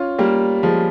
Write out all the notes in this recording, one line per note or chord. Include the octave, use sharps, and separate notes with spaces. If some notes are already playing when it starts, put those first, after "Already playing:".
Already playing: C#4 F4
G3 A#3
F3 G#3